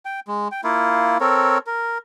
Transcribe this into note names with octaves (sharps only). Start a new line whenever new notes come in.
G5
G#3
G5
A#3 E4 F4
C4 A4 A#4 C#5
A#4